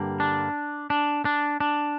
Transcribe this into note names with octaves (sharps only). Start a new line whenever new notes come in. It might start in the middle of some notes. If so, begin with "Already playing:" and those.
Already playing: G2 D3 G3 A#3
D4
D4
D4
D4